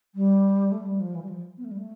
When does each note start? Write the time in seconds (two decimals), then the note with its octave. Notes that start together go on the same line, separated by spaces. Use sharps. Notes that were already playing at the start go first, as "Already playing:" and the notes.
0.15 G3
0.71 A3
0.85 G3
1.00 F3
1.14 E3
1.22 G3
1.28 F3
1.57 B3
1.64 A3
1.71 G3
1.78 A3